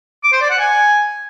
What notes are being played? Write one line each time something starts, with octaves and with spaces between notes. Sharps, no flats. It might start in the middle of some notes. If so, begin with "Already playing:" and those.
D6
C5
D5
F#5
G#5